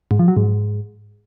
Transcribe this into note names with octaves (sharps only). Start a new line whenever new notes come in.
G#2
F3
F#3
G#2